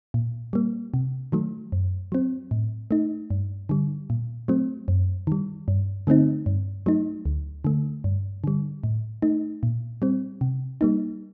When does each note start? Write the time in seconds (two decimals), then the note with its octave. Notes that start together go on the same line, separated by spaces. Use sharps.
0.14 A#2
0.53 G3 A#3
0.94 C3
1.32 D#3 F#3 A3
1.72 F#2
2.12 F#3 C4
2.51 A2
2.91 A3 D#4
3.30 G2
3.69 D3 G3
4.10 A#2
4.48 F#3 A3 C4
4.88 F#2
5.27 D#3 G3
5.68 G2
6.07 D3 A3 C4 D#4
6.46 G2
6.86 F#3 A3 D#4
7.25 D2
7.65 D3 A3
8.04 G2
8.44 D3 G3
8.84 A2
9.22 A3 D#4
9.63 A#2
10.02 G3 C4
10.41 C3
10.81 G3 A#3 D#4